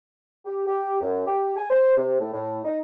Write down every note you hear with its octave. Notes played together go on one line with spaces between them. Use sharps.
G4
G4
F#2
G4
G#5
C5
C3
A2
A2
D#4